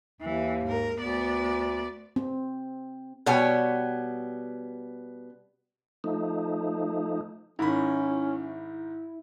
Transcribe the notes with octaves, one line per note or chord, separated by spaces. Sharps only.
D#2 E3
G#2 A#4
D2 B3 D5
C4
B2 G3 B3 C#5 G5 G#5
F3 A3 D#4
G#2 D#3 C#4 E4 B5